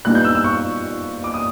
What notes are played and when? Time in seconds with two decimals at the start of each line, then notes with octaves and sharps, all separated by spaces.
0.05 A#2 G3 B3 D#4 F#6
0.15 G6
0.25 E6
0.35 E6
0.44 C#6
1.24 D6
1.34 D#6